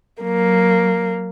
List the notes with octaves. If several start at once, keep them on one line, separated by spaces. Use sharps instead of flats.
F#3 A#3